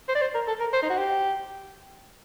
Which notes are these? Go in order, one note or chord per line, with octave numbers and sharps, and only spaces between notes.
C5
D5
C5
A#4
A4
A#4
C5
D#4
F#4
G4